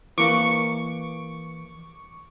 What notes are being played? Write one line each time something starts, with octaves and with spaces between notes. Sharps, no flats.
E3 A#3 C#6 D6